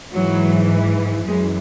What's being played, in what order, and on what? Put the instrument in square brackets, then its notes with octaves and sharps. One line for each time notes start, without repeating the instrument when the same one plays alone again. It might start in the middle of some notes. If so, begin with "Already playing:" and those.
[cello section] G#2 E3 F#3
F#2 E3 G#3